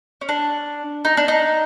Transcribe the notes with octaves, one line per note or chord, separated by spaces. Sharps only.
C#4
D4
D#4
D4
D#4